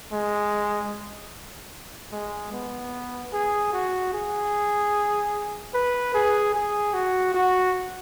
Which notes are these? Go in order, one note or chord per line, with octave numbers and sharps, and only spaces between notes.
G#3
G#3
B3
G#4
F#4
G#4
B4
G#4
G#4
F#4
F#4